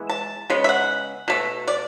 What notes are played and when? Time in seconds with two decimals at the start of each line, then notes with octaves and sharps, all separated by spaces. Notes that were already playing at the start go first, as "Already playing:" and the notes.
Already playing: E3 G#3 B3
0.10 A5
0.50 C#3 G#3 B3
0.64 E5
0.69 F#5
1.28 B2 A3
1.68 D5